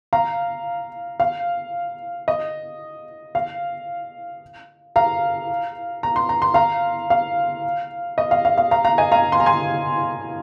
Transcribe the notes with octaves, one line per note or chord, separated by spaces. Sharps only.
F5 A#5
F5
D#5
F5
F5 A#5
A#5
C6
A#5
C6
F5 A#5
F5
D#5
F5
F5
F5
F5 A#5
F5 A#5
D#5 G#5
F5 A#5
C6
A#5
G#5 C6